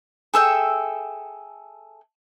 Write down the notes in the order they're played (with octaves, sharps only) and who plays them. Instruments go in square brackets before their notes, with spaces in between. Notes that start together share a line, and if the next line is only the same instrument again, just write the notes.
[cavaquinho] G#4 A4 E5 G5